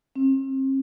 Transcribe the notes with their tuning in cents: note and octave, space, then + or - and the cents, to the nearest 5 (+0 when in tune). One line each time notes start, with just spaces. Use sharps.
C4 +40